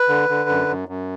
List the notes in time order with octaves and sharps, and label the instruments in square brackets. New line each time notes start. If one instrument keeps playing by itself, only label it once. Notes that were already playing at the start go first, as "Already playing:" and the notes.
Already playing: [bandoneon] B4
D3
D3
F#2
F#2
F#2